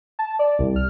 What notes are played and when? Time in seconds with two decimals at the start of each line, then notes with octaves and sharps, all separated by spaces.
0.19 A5
0.39 D5
0.59 C2
0.76 F6